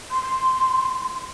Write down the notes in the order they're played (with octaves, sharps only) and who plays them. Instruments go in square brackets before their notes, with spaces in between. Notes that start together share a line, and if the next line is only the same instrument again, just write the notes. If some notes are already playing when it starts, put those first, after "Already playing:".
[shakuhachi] C6